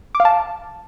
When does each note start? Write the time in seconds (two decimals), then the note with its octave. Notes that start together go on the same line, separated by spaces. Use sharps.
0.15 D6
0.20 F5
0.25 A5